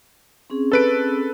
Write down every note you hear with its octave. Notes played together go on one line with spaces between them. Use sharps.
C4 C#4 G#4
A4 B4 D7